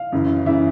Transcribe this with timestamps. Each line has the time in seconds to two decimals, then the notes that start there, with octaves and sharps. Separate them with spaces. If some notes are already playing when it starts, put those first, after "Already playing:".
Already playing: F5
0.12 F#2 C#3 E3
0.46 C#3 E3 E5